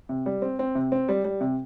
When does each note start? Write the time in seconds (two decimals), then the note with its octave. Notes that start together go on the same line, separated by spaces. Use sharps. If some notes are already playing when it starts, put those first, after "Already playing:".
0.09 C3
0.26 G3
0.42 C4
0.59 C4
0.75 C3
0.92 C4
1.09 G3
1.25 G3
1.41 C3